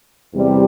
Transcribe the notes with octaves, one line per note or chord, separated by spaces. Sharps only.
E2 C3 G3